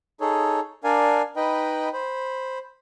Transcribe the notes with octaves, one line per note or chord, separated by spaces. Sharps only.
D#4 G#4 A4 C#5
D4 A#4 D5 F5 G#5
D#4 B4 D#5 G5 B5
C5 B5